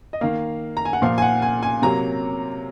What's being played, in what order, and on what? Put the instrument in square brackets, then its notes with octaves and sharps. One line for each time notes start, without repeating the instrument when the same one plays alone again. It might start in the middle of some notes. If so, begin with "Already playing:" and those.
[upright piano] D#5
D#3 A#3 F5
A#5
G#5
F#5
A#2 F3 A#3 F5
G#5
F#5
G#5
G#5
C3 F#3 A#3 A#5